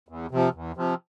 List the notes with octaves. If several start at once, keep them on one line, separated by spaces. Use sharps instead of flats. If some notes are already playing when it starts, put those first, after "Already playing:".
E2
C3 F3
E2
C3 F3